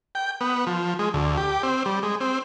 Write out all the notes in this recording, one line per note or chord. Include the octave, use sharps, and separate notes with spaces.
G5
B3
F3
G#3
D2
G4
C4
G3
G#3
C4